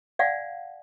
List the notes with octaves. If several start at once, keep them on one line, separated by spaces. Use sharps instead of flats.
D5 F5 F#5 G#5